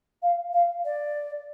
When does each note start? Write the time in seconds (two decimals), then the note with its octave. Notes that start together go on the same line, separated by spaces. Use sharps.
0.22 F5
0.53 F5
0.84 D5